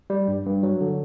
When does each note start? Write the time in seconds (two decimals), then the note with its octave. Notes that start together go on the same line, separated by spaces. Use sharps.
0.10 G3
0.28 G2
0.46 G2
0.63 F#3
0.81 D3